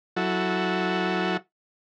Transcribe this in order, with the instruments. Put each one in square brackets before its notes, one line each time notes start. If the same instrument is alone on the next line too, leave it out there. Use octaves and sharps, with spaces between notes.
[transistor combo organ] F#3 E4 F#4 A4